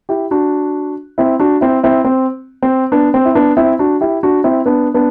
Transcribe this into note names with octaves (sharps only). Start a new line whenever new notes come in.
E4 G4
D4 F#4
C4 E4
D4 F#4
C4 E4
C4 E4
C4
C4
B3 D4
C4
E4
B3 D4
C4 E4
D4 F#4
E4 G4
D4 F#4
C4 E4
B3 D4
B3 D4